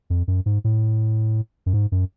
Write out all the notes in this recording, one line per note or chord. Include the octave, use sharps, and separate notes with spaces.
F2
F#2
G#2
A2
F#2
G#2
F#2